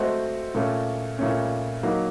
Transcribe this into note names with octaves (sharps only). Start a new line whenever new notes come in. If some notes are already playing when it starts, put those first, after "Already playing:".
Already playing: A3 C4 F#4 C5 D#5
A#2 A3 C#4
A#2 A3 C#4
F#3 A#3 D#4